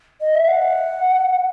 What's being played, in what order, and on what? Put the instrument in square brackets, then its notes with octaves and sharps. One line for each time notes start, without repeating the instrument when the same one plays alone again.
[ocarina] D#5
E5
F#5